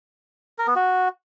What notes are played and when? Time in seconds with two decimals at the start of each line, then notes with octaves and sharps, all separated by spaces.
0.59 A#4
0.67 B3
0.75 F#4